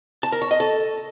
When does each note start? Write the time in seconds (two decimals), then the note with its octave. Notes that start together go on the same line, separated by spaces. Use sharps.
0.23 A5
0.32 A#4
0.42 C#5
0.51 D#5
0.60 A4